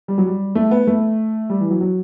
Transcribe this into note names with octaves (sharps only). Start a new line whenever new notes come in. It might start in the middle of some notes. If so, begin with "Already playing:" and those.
G3
F#3
G3
A3
B3
A3
G3
E3
F#3
F#3